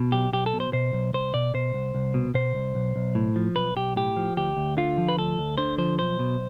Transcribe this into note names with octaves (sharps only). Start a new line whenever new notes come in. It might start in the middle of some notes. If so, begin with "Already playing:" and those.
Already playing: B2
B1 G4
B1 G4
A4
B2
C5
B2 C5
B1
C2 C5
B2 D5
B2 C5
C2
C2
B2
B2 C5
C2
B1
B1
A2
F3
B1 B4
B1 G4
A2 G4
F3
D2 G4
D2
D3 F4
F3
B4
D2 A4
D2
D3 C5
F3 C5
B1 C5
B2